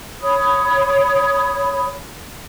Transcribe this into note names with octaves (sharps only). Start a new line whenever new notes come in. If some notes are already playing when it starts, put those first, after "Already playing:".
C#5 B5 D#6